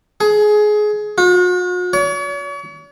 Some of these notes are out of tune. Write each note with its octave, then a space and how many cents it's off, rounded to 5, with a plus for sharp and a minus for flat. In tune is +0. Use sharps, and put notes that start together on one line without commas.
G#4 +20
F#4 -45
C#5 +40